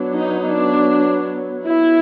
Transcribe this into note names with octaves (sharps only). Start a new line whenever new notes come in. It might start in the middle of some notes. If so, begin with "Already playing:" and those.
Already playing: F#3 B3 D4
D#4
D4
E4